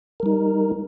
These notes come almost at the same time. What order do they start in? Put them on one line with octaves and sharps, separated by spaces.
A#4 G3 D#4